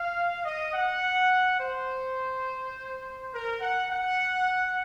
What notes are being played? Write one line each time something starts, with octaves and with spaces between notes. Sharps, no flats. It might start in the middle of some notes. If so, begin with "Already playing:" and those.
Already playing: F5
D#5
F#5
C5
A#4
F#5
F#5